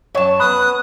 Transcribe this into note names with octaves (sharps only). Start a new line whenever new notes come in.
F#2 F#3 C#5 A5
B3 B4 B5 D#6 F#6